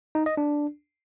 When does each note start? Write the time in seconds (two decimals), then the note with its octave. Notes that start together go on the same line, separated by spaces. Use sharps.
0.15 D#4
0.26 D#5
0.37 D4